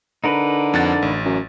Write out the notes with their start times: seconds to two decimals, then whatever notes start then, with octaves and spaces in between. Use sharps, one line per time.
0.24 D3 D#4 A#4 B4
0.74 F2 F#5 A6
1.02 A1
1.25 F#2